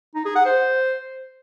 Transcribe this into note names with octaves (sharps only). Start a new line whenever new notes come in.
D#4
G#4
F#5
C5